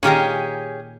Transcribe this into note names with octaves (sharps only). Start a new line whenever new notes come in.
A#2 D#3 C#4 G4 G#4 A#4